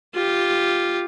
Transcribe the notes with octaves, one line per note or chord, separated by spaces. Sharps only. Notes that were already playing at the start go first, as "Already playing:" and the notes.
F4 G4